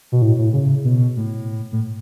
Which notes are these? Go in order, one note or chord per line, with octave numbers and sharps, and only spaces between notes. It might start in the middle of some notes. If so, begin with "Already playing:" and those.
B2
A2
A2
C#3
B2
A2
A2